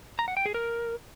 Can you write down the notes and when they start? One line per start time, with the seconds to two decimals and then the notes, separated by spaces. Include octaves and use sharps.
0.19 A#5
0.28 F#5
0.37 G5
0.46 G#4
0.54 A#4